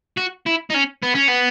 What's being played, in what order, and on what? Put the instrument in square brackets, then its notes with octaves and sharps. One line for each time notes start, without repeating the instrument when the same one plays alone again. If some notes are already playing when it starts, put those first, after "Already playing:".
[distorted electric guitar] F#4
E4
D#4
C#4
B3
C#4
B3